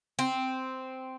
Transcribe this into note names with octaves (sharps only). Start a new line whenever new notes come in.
C4